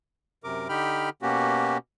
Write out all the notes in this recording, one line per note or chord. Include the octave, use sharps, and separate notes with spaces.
F#2 C3 A#4 D6
D3 D#4 G4 G5 B5 F6
B2 A#3 C#4 F#4 G4